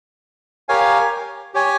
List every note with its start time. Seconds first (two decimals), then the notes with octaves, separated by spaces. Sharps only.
0.69 G4 A#4 C#5 F5 G#5
1.54 G4 C#5 G#5